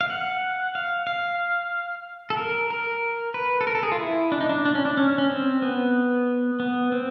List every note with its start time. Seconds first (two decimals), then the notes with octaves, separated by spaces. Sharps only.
0.01 F5
0.10 F#5
0.75 F5
1.07 F5
2.30 A4
2.37 A#4
2.70 A#4
3.34 B4
3.61 A4
3.67 A#4
3.75 A4
3.83 G#4
3.92 F4
4.00 E4
4.32 D4
4.41 D#4
4.49 D4
4.65 D4
4.75 C#4
4.85 D4
4.97 C#4
5.18 C#4
5.30 C4
5.62 B3
6.60 B3
6.92 C4